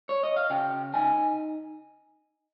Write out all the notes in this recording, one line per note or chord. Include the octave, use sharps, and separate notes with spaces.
C#5
D#5
F5
C#3 G5
D#4 G#5